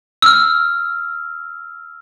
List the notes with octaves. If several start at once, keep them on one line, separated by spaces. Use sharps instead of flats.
E6 F6